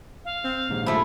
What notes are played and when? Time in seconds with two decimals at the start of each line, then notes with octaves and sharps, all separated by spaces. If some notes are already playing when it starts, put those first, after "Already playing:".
0.25 F5
0.44 C4
0.69 A#1 D#2 G#2
0.86 F3 A3 E4